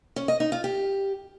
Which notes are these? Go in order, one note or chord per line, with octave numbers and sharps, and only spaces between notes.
C#4
D#5
D#4
F4
G4